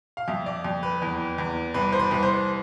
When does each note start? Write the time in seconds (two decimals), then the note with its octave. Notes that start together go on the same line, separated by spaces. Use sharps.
0.17 F5
0.28 F2 E5
0.46 D5
0.64 F2
0.83 B4
1.02 E2
1.38 E2
1.74 C2 B4
1.92 C5
1.99 B4
2.11 C2
2.23 C5